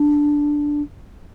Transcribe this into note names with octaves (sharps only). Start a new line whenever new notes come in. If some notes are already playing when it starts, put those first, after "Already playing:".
Already playing: D4